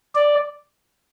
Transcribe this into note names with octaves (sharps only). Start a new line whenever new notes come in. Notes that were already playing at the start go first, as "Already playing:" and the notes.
D5